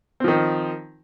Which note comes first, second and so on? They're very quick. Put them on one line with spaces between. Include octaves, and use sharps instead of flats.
C4 F3 D#3